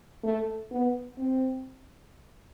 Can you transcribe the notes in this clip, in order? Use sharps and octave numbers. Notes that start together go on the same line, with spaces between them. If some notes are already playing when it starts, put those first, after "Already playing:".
A3
B3
C4